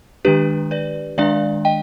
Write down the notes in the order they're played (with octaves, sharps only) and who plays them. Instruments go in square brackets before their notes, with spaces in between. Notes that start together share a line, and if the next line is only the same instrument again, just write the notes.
[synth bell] D#3 G#3 D4 G4 B4
B4 D5
D#3 G#3 D4 D5 F5
D#5 G5